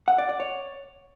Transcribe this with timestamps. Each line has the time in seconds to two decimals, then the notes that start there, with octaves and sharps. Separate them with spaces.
0.08 F#5
0.18 D5
0.29 D5
0.40 C#5